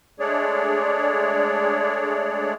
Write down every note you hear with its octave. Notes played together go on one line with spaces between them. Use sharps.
G#3 A3 D4 G#4 C#5 D5